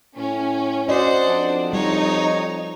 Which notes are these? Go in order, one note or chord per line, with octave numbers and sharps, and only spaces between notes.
A2 C#4
F#4 C5 D5 D#5 F#5
F2 D4
G3 D#4 C#5